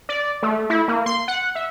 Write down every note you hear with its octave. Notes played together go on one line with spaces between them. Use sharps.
D5
A3
E4
A#3
C6
F#5
E5